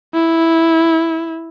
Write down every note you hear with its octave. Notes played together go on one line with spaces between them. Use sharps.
E4